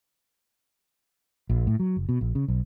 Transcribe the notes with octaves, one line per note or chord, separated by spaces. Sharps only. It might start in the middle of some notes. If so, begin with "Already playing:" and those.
A#1
A2
F#3
F#1
B2
A#1
C#3
B1